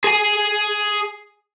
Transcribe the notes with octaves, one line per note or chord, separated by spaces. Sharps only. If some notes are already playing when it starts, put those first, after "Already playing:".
G#4 G#5